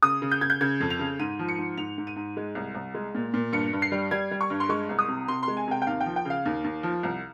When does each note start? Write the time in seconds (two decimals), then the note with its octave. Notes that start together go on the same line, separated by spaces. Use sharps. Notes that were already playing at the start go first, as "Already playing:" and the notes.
0.03 C#3 D#6
0.22 C#3
0.31 G6
0.41 C#3 G#6
0.50 G6
0.61 C#3 G#6
0.81 F2
0.90 F7
0.99 C#3
1.19 G#2 D#7
1.39 F3
1.48 C#7
1.58 G#2
1.78 G#2 F7
1.98 G#2
2.07 D#7
2.16 G#2
2.37 G#3
2.55 C2
2.75 C2
2.94 G#3
3.15 A#2
3.34 A#2
3.53 G2 C#7
3.73 G2
3.82 C7
3.92 G3
4.11 G3 G#6
4.31 G3
4.41 C#6
4.50 G2
4.60 C6
4.69 G#3 C#6
4.89 C2
4.99 D#6
5.08 C3
5.28 C3 C6
5.43 G#3 C6
5.57 G#5
5.68 C3 G5
5.82 G5
5.87 D#2 F5
6.00 G5
6.06 F3
6.16 G5
6.25 C#3 F5
6.45 D#2
6.64 D#2
6.83 F3
7.03 C2